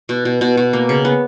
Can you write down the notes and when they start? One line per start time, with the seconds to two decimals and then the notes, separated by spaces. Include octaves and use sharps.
0.09 B2
0.25 B2
0.41 B2
0.57 B2
0.73 A#3
0.89 C#3
1.05 B3